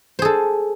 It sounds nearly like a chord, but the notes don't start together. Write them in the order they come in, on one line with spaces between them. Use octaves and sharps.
C5 G#4 A4